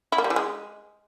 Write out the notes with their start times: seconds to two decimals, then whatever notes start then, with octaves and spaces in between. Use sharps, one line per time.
0.12 E4
0.18 A#3
0.24 G3
0.30 E3
0.36 G#3